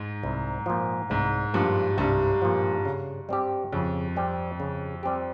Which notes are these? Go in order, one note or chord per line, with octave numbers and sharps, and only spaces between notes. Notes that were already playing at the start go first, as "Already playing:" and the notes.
Already playing: G#2
C2
A#2 F3
C2 G#2
G2 A#2 F3
C2 G2
A#2 F3
C#3
G3 C4 G4
F2 C#3
G3 C4 G4
C#3
G3 C4 G4